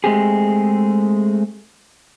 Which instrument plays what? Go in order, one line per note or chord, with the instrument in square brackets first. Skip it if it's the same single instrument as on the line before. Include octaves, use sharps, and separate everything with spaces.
[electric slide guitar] G#3 A3 C4 G4 G#4